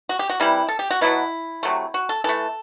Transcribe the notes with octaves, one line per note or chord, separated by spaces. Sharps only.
F#4
G4
F#4
C3 E3 G3 E4
A4
G4
F#4
B2 F#3 B3 E4
C3 F#3 A3
F#4
A4
E3 A3 A4